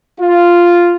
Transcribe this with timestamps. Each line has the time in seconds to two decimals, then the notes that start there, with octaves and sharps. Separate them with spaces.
0.20 F4